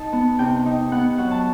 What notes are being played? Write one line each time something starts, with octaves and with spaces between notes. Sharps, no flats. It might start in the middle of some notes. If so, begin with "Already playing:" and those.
Already playing: D#4 A5
B3
C3 G5
D#4
B3 F#5
F#3 F#5
A5